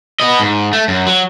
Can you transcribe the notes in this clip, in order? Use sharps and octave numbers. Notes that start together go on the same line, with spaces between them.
B3 D#5
G#2
A3
F#2
F#3